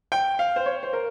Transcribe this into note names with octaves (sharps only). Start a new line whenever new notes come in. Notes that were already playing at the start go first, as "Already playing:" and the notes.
G5
F5
C5
C#5
C5
A#4